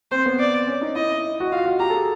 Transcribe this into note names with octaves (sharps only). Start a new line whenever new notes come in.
C4 C5
B3
D5
C#4
D#4
E4 D#5
F#4
F4 F5
F#4
G4 A#5
A4
G#4